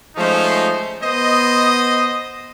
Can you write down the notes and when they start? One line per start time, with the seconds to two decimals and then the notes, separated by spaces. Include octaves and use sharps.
0.16 F3 G#3 A3 C#4 D#4 C5
1.01 B3 C5 D#5